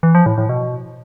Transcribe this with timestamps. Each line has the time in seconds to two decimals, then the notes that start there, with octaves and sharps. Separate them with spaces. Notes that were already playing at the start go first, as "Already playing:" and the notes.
0.03 E3
0.15 F3
0.26 A2
0.38 A2
0.49 B2